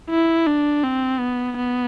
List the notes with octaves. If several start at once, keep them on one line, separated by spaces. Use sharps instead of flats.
E4
D4
C4
B3
B3